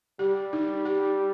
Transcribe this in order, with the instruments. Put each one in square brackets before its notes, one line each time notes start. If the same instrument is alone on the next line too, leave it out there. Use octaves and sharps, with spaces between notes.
[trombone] G3 [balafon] G4
[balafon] D#4
G4